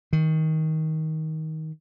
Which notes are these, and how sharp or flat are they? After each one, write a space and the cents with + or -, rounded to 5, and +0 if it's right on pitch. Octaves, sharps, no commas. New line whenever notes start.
D#3 +20